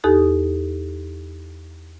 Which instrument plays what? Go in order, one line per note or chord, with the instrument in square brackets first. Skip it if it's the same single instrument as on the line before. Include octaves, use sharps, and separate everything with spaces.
[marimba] E2 D#4 G4 A4 D#6 F#6